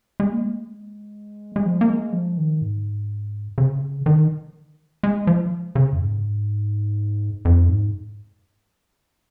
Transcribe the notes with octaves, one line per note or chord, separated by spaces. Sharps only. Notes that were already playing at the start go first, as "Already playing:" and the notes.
G#3
A#3
G#3
G#3
F3
A#3
G#3
F3
D#3
G#2
C#3
D#3
G#3
F3
C#3
F2
G#2
F2
G#2